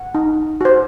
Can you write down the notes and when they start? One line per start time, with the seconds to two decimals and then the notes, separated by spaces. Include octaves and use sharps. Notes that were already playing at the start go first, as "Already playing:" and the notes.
Already playing: F#5
0.15 D#4
0.61 F#4 C5